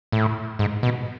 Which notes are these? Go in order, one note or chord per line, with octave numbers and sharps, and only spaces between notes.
A2
G#2
B2